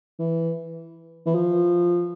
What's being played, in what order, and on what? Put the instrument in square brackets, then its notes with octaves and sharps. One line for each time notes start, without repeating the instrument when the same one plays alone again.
[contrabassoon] E3
E3
F3